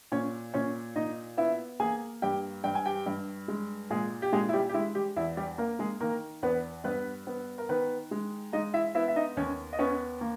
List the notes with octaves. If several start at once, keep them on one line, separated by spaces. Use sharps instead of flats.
A#2 C#4 C#5
A#2 C#4 C#5
A#2 D#4 D#5
B3 E4 E5
A#3 G#4 G#5
G2 G4 G5
G2 G5
G#5
G4 G5
G2
G#3
A#2 G#3 G#4
G4
A#2 G#3 G#4
E4
G3 G4
G4
G#3 E4
G3 G4
E2 E4
G3 G4
A#3 A#4
G#3 G#4
D#3 A#3 A#4
E2 B3 B4
G2 B3 B4
B3
A#4
D#3 B3 B4
G#3
G#3 D#4 D#5
E4 E5
B3 E4 E5
E5
D#4 D#5
D#2 C#4 C#5
D#5
B3 C#4 C#5
A#3